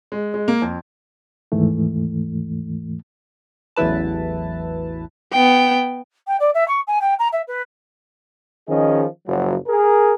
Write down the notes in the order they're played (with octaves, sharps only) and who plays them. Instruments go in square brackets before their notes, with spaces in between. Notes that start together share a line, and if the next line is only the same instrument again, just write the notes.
[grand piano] G#3
G#3
A#3
F2
[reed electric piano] D#2 G#2 E3 A3
[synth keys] A1 E2 F#3 E4 B4 A5
[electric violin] B3 G5
[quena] G5
D5
E5
C#6
G#5
G5
A#5
E5
B4
[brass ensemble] D#3 F3 C#4 G#4 D#5
F#1 F3 F#3
G#4 A#4